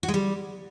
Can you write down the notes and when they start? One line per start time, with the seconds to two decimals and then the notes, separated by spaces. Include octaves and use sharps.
0.03 F#4
0.08 G#3
0.14 G3